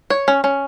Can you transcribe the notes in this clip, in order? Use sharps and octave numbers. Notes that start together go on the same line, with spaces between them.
C#5
C#4
C#4